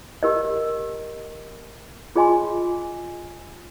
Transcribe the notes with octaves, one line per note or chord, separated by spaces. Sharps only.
G4 A#4 D#5
F4 G#4 D#5 G#5 C6